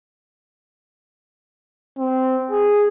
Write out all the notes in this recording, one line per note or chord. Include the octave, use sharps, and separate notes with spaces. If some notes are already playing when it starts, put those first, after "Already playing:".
C4
G#4